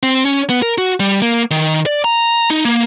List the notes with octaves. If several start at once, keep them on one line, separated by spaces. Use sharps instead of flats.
C4
C#4
B3
A#4
F#4
G3
A#3
D#3
D5
A#5
D#4
A#3